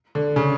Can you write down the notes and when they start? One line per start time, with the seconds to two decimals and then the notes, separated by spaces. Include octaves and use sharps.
0.15 D3
0.36 C#3